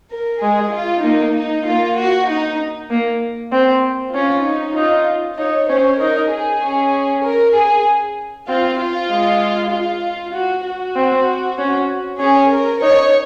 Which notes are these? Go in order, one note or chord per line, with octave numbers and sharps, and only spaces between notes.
A#4
G#3 G#4
F4
A#3 D#4
D#4
A#3 F4
F#4
D#4
A#3
C4
C#4 F4
D#4
D#4 F4
D#4 C#5
C#4 C5
D#4 A#4
G#4
C#4
A#4
G#4
C4 F4
F4
G#3
F4
F#4
F#4
C4
C#4
C#4 G#4
A#4
D#4 C#5